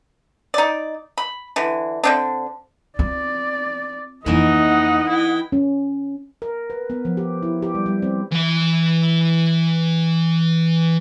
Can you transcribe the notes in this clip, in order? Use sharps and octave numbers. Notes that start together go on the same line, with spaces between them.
D#4 D5
B5
D3 E3
D3 C4 D4
C4 F4 D5
F2 E3 A#3 D#4 E4 D#5 F#5
E4 G5
C#4
A#4
B4
B3
F3
G4
E4
G4
G3
G3
C4
E3 E5